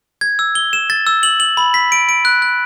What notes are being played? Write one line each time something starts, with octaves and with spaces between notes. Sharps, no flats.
G#6
E6
G7
E7
A6
E6
F#7
F#7
B5
B6
D7
D7
F#6
F#6